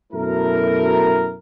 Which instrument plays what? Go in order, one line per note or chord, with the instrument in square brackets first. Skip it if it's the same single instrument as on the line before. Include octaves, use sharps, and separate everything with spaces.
[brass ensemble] F#2 B2 A3 E4 A4 A#4